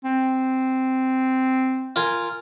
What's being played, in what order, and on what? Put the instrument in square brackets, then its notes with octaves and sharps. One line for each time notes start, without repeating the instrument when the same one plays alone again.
[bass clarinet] C4
[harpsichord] F4 A#4 G#5